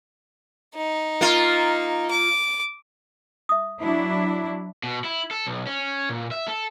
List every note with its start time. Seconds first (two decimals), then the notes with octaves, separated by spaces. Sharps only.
0.75 D#4
1.21 A#3 F4
2.10 D6
3.49 E5 D#6
3.81 F#3 D4 E4
4.83 B2
5.04 E4
5.31 A4
5.47 B1
5.67 C#4
6.09 A#2
6.31 E5
6.48 A4